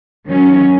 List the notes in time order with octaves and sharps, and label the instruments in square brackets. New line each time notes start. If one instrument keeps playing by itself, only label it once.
[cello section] D#3 F#3 C#4